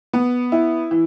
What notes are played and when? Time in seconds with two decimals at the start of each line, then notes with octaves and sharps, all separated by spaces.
0.13 B3
0.52 E4
0.91 E3